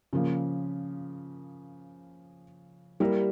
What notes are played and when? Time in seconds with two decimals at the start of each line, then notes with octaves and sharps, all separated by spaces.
0.13 C#3 F3 A#3
3.00 G3 A#3 E4 A#4